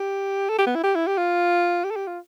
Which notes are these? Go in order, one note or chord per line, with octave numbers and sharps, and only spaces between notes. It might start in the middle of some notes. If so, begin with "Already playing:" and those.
Already playing: G4
A4
G4
B3
E4
G4
E4
G4
F4
G4
A4
G4
F4